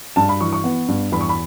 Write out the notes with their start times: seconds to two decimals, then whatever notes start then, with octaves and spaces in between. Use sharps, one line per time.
0.16 G2 A5
0.29 B5
0.41 E3 C#6
0.53 C#6
0.64 B3
0.88 G2
1.12 E2 B5
1.21 C#6
1.29 B5